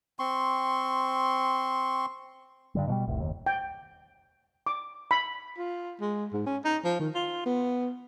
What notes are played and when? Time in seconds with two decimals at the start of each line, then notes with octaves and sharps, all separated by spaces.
0.19 C4 C6 C#6
2.75 G2 D3 G3
2.87 B2 F3 G3
3.08 F1 C2 A2
3.20 F#1 D#2
3.46 G5
4.67 D6
5.11 B5
5.58 F4
6.01 G#3
6.33 G#2
6.46 C#4
6.65 D#4
6.84 F3
7.00 D#3
7.15 F4
7.46 B3